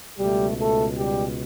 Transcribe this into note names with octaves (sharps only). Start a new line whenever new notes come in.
C#2 B2 G3 A3 G4
A3 A4
G3 G4